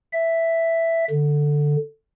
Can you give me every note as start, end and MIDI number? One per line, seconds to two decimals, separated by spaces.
0.13 1.05 76
1.10 1.76 50